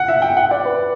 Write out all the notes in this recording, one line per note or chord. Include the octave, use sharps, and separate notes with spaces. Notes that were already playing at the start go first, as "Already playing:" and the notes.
Already playing: F#5
E5
G5
F#5
D5
B4